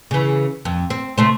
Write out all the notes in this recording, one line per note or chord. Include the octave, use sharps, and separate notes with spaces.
C#3 E3
F2
C4
C3 A3 C5